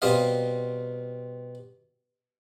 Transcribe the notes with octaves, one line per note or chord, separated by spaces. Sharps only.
B2 G3 C4 A#4 D#5 F5